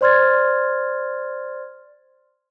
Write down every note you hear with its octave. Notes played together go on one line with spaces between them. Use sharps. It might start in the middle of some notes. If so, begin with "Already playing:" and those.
C5 D5 C6 F6 G#6 A6